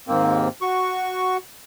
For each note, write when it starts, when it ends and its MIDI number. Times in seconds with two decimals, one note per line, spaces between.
0.08 0.48 39
0.08 0.48 44
0.08 0.48 58
0.08 0.48 60
0.62 1.37 66
0.62 1.37 85